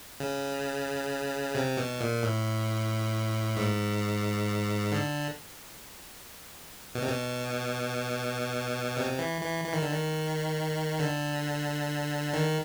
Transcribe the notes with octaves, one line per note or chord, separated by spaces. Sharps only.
C#3
C3
B2
A#2
A2
G#2
D3
B2
C3
B2
C3
E3
E3
E3
D#3
D3
D#3
D3
D#3